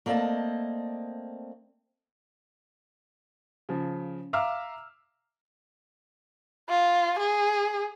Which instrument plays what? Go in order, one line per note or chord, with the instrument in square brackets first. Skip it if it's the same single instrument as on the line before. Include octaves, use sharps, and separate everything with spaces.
[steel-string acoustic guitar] A3 A#3 C4 D5 D#5 A5
[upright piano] C#3 F3
E5 F5 A#5 D6 E6 F6
[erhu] F4
G#4